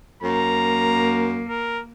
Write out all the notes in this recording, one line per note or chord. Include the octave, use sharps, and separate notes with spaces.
F#2 A#3 A#5
A#4